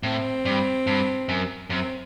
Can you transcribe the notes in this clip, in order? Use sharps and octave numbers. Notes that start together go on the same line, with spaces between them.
A2 C4
G2
G2
F#2
F#2 C4